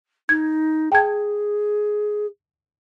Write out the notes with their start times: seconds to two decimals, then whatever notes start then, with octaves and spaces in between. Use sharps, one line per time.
0.29 D#4 G#6
0.92 G#4 G5 A5 G#6